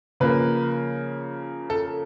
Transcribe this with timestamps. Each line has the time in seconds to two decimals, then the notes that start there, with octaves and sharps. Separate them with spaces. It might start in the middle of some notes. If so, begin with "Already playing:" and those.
0.20 C#3 F3 A#3 B4
1.70 A4